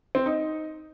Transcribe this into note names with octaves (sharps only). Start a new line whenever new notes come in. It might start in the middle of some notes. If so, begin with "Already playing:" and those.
C4
D#4